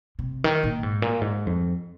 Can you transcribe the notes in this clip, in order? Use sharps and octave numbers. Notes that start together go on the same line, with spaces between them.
C3
D#3
A#2
G#2
A#2
G#2
F2